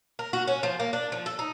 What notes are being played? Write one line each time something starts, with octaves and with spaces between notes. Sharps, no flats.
A#4
F#4
C#4
F3
A#3
D4
F3
A4
D#4